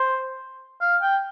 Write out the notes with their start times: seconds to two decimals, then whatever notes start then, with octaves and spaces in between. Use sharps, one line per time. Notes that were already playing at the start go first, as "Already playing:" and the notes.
Already playing: C5
0.81 F5
1.02 G5